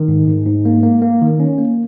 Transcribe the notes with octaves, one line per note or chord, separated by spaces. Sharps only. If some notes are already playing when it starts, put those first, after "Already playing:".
Already playing: D#3
G#2
G#2
G#2
A#3
A#3
A#3
D#3
C#4
A#3